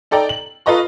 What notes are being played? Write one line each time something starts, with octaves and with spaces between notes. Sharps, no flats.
D#4 A4 D5 G5 A#5
F#7
F4 A4 B4 D#5 A#5 C#6